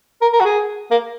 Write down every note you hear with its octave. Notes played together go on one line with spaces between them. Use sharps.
A#4
A#4
F#4
G#4
A#3